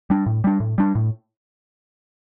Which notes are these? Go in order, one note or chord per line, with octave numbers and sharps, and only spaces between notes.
G3 D4
A2
G3 D4
A2
G3 D4
A2